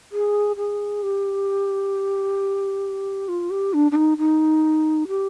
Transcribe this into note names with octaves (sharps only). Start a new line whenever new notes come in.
G#4
G#4
G4
F4
G4
D4
D4
D#4
D#4
G4